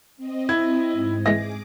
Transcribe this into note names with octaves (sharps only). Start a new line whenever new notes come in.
C4 D#5
E4 G#6
G#2
E3 G#3 G#4 D6 A#6